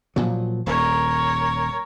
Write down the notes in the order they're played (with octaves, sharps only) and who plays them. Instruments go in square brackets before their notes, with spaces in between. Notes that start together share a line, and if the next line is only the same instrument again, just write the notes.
[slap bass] A#2 F3 F#3
[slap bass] D#1 [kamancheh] A#4 C#5